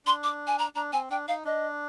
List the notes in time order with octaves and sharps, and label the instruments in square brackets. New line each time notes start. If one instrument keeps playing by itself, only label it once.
[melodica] D4 [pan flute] C6
[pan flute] D6
G#5
A#5
[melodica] D4 [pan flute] A#5
[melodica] C4 [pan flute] G#5
[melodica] D4 [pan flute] G5
[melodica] D#4 [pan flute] F5
[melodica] D4 [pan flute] D#5